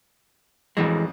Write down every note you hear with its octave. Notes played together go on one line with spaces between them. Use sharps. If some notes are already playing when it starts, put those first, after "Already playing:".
A1 F2 E3 G#3